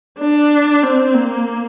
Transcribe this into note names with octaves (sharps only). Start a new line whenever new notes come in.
D4
C4
A#3